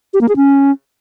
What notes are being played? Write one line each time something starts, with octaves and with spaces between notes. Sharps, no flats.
G4
A#3
G#4
C#4